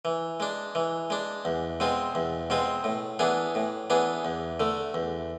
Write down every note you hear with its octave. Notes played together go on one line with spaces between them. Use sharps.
E3
G#3 D4
E3
G#3 D4
E2
B2 G#3 C4 F4
E2
B2 G#3 C4 F4
A2
E3 B3 D4 G#4
A2
E3 B3 D4 G#4
E2
D3 A3
E2